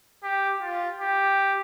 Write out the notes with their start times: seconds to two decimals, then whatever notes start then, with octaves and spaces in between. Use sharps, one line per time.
0.23 G4
0.62 F4
1.00 G4